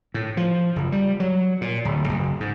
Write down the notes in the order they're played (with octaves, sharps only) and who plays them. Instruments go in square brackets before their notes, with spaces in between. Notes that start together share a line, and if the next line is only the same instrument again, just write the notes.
[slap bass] A2
F3
F#1
G3
F#3
A#2
D1
F#1
G#2